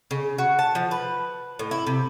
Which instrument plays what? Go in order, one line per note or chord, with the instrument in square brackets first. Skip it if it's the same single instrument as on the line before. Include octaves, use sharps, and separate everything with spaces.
[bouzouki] C#3
F#4
A5
F3
B4
A2
E4
C3